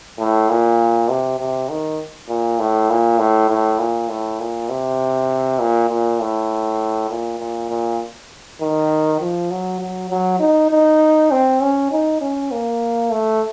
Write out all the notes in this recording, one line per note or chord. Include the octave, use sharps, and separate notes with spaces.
A2
A#2
C3
C3
D#3
A#2
A2
A#2
A2
A2
A#2
A2
A#2
C3
A#2
A#2
A2
A#2
A#2
A#2
D#3
F3
F#3
F#3
F#3
D#4
D#4
C4
C#4
D#4
C#4
A#3
A3